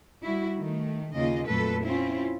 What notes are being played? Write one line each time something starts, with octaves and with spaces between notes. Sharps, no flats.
G3 E4 F#4
D#3 A3
D#2 C#3 A#3 F4 D#5
F2 A#2 F#3 A3 A4 B4
C4 C#4 E4 F4